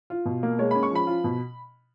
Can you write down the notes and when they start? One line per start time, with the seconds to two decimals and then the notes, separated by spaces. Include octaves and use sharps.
0.10 F4
0.25 B2
0.43 A#3
0.59 G#3 C#5
0.71 C#4 B5
0.83 C#6
0.91 F3 B5
1.07 F4
1.24 B2